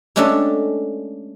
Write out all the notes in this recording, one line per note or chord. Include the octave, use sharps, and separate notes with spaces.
G#3 A3 C#4 D4 G4 A4